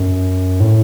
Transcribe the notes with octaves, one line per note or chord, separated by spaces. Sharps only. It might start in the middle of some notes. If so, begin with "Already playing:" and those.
Already playing: F#2
A2